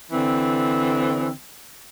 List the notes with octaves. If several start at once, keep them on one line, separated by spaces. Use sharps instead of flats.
D3 E3 C4